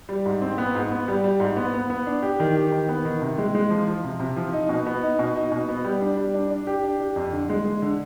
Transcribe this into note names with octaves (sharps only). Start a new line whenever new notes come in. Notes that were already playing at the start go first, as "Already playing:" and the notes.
G3
G#2
C4
B3
G#2
B3
G3
G3
G#2
B3
B3
B3
D4
G4
D#3
G4
D#3
B3
D#3
C3
G#3
G#3
F3
F3
C3
C3
F3
D#4
B2
B3
D#4
B2
D#4
B2
B3
G3
D4
G3
D4
D4
G4
D4
G4
F2
D3
G#3
G#3
D3